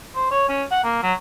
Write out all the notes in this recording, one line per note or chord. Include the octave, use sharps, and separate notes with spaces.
C5
C#5
C#4
F#5
A#3
F#3